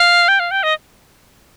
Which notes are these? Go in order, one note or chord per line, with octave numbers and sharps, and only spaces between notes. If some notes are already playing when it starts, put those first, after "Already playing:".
Already playing: F5
G5
F5
G5
D#5